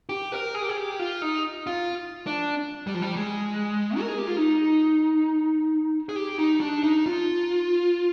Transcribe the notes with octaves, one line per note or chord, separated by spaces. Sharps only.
G4
A#4
G#4
G4
G#4
G4
F4
D#4
F4
D4
G3
F3
G3
G#3
A#4
G#4
G4
F4
D#4
G#4
G4
D#4
D4
D#4
F4